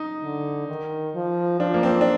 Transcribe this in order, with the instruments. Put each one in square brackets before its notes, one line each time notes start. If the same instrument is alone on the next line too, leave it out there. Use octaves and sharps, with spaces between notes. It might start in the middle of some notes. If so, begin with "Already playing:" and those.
Already playing: [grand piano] D#4
[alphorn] D3
D#3
F3
[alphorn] F3 [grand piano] D4
[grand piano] A#3
C4
D4